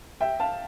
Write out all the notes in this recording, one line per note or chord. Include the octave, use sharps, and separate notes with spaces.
E5 G5
F5 A5